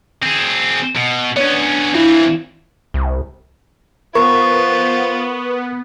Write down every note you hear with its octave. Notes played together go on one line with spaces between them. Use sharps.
C4 G#4
B2
B3 C#4 D4 C#5
E3 C4 E4 F4
C2
B3 F4 A#4 C5 C#6